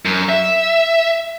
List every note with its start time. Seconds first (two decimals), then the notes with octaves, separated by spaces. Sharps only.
0.05 F#2
0.29 E5